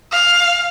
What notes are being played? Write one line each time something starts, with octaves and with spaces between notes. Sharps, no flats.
F5